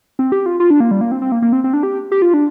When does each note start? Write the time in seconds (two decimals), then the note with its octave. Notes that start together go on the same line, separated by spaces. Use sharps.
0.19 C4
0.32 G4
0.46 F4
0.60 F4
0.70 D4
0.80 A#3
0.91 G3
1.01 A#3
1.12 C4
1.22 C4
1.32 A#3
1.42 A#3
1.53 C4
1.64 C4
1.73 D4
1.83 G4
2.12 G4
2.22 F4
2.34 D4